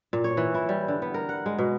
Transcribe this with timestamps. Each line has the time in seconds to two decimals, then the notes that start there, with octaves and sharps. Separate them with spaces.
0.13 A#2
0.24 C#5
0.37 E3
0.54 E4
0.69 G3
0.88 D3
1.02 B3
1.14 A#4
1.29 F#5
1.46 G#3
1.59 B2